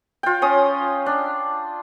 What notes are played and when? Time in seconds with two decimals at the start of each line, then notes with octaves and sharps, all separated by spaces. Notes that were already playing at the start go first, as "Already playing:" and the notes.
0.23 F4 G5
0.42 C#4 C#5 D#6
1.06 D4